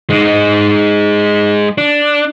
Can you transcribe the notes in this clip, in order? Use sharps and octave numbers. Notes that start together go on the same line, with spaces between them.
G#3 D#4
D4